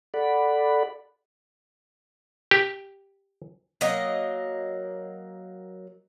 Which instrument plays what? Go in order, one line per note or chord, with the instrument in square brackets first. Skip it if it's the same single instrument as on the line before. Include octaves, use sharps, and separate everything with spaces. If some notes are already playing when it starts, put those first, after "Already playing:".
[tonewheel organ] A4 D5 F#5 B5
[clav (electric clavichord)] G4
[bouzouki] F#3 A#3 D#5